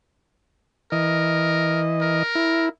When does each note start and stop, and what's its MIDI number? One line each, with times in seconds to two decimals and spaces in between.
0.92 2.23 52
0.92 1.81 70
0.92 2.23 75
2.02 2.67 70
2.35 2.69 64